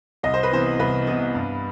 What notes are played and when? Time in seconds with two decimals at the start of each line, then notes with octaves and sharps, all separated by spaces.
0.23 C2 D#5
0.34 C5
0.43 B4
0.52 C3 E3 B3 C5
0.79 C2 B4
1.07 C3 E3 B3
1.35 G2